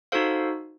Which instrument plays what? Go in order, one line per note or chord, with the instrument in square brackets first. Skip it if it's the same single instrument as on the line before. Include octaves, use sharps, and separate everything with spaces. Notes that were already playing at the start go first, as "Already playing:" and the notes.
[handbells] D#4 F#4 A4 C5 F5